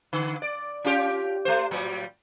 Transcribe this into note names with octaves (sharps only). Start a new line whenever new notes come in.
D3
D5
C#4 F4 G4
A3 C5
A2 F#3 G3